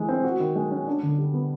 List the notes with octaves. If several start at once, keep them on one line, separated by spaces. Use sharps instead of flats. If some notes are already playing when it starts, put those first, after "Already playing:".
Already playing: E3 G#3
C4
F#4
D#3
G#3
C#4
D4
D3
G3
B3